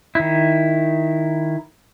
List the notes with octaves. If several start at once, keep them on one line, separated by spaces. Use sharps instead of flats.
D#3 E4